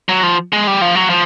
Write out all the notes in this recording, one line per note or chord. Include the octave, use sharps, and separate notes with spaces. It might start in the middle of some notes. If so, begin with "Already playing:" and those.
F#3
F3
G#3
G3
F3
F#3
F3